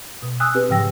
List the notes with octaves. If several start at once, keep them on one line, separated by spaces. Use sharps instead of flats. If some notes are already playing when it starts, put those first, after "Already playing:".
B2
G#5 D#6 E6 F#6
C4 G4 B4
G#2 C#3 F3 G5 E6 A#6